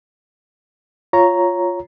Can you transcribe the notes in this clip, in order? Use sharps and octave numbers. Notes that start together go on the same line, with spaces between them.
F4 C#5 A#5